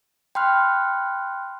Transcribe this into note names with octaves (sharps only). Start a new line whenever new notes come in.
G5 B5 C6 F6 F#6